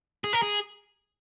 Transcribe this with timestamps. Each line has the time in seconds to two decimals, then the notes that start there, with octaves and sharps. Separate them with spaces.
0.24 G#4
0.33 A#4
0.42 G#4